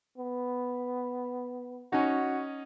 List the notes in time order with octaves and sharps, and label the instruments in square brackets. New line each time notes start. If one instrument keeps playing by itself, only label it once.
[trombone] B3
[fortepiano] C#4 D#4 [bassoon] F#4